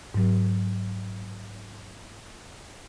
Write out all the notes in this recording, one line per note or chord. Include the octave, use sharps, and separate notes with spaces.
G#2 F#3